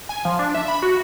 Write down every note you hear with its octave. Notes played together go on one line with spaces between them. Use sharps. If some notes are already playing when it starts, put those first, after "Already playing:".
G#5
F3
D4
E5
B5
F#4